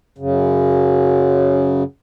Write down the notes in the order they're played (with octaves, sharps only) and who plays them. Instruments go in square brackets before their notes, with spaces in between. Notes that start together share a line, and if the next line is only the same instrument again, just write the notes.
[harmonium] F#2 C#3